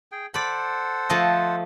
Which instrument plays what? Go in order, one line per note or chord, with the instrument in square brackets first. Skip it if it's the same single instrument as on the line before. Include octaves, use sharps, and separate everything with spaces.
[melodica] G#4 G5
[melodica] A4 C5 F#5 [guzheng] D5 B5
[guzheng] F3 A3 D#5